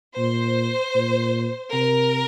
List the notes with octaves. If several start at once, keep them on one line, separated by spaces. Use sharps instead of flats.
A#2 C5
A#2
C3 A#4